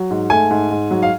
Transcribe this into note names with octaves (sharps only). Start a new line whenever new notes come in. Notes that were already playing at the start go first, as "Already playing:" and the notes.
Already playing: F#3
G#2
A3 G#5
G#2
G#2
F#3
F5